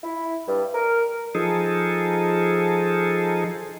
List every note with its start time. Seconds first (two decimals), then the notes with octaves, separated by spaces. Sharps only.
0.04 E4
0.47 G2
0.73 A#4
1.35 F3 D#4 G#4 A4